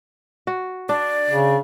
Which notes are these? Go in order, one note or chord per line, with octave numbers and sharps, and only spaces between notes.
F#4
D4 D5
C#3